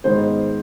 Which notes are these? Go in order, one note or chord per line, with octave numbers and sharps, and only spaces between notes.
G#2 D#3 G#3 B3 C5